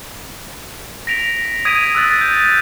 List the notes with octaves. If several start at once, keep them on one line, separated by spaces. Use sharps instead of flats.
A#6 B6 D7 F7
D#6 G#6 B6 D7 D#7
E6 F#6 A6
G6